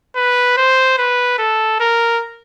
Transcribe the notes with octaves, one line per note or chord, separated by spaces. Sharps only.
B4
C5
B4
A4
A#4